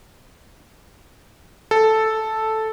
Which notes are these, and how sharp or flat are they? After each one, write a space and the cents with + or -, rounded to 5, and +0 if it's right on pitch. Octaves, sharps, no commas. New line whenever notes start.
A4 -5